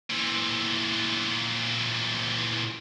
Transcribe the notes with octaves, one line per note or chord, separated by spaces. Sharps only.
A#2 E3